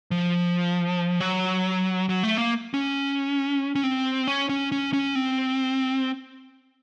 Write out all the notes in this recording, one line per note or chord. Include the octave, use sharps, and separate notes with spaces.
F3
F#3
F#3
A3
A#3
C#4
C#4
C4
C#4
C#4
C#4
C#4
C4